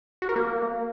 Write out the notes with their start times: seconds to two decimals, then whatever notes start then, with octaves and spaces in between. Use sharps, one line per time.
0.22 F#4
0.29 A#4
0.36 A#3